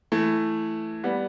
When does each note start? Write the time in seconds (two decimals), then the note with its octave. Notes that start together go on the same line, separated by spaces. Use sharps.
0.12 E3 A3
1.04 G3 B3